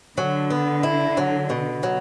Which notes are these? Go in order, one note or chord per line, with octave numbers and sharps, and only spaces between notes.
D3 F#3
B3
E4
F#3
B2
F#3